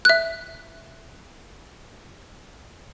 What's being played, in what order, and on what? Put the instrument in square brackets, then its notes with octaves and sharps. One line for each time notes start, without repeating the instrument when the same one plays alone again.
[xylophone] E5 F#6